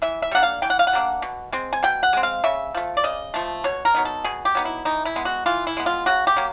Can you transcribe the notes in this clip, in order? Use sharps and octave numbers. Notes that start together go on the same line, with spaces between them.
E3 E5
E5
G3 A#3 D4 F#5
F5
E3 G5
F#5
F5
F#5
G3 A#3 D4
B2
G#3 C4
G#5
B2 G5
F#5
G#3 C4
F5
C#3 E5
F3 A3
D5
C#3 D#5
F3 A3
B2 C#5
A#4
F#3 B3 D#4
A4
B2 G#4
G4
F#3 B3 D#4
E4
E3 D#4
E4
G#3 B3
F#4
E3 F4
E4
G#3 B3
F4
C#3 F#4
G4
F#3 A#3